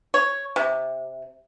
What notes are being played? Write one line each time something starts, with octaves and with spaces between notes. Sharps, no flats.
C#5
C3